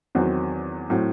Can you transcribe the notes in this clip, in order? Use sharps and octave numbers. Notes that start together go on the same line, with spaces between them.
E2 D#3 F#3 C4 F#4
A2 F#3 C4 F#4